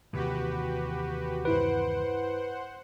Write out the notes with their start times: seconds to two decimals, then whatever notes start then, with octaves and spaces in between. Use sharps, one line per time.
0.13 D#2 C3 E3 F#4 G4 B4
1.45 G2 E4 B4 C5 F#5 D7